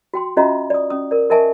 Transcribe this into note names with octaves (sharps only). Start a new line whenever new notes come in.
F#4 G5 C6
C#4 F4 F#4 D#5 E5 A#5
D5 D#6
C#4 D#6
A#4 D5
A#4 D#5 E5 G#5 A5 C#6